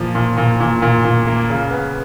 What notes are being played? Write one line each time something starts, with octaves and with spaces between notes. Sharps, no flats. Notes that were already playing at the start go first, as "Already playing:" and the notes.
Already playing: A#2 F3
A#2
A#2
A#2
A#2
A#2
A#3
C#3
B3